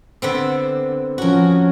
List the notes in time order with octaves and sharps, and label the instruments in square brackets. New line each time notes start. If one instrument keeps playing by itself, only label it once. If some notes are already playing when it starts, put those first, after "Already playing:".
[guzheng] D3 B3 C4
[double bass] F3 C#4 [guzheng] F#4 A#4